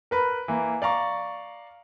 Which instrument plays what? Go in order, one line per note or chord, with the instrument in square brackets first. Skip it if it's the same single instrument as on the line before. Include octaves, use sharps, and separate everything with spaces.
[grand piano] A#4 B4 B5
E3 A#3
D5 F5 A#5 C#6